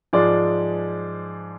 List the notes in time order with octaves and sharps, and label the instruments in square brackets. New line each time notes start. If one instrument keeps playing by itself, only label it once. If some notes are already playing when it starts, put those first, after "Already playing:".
[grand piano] G#2 F3 G#3 D5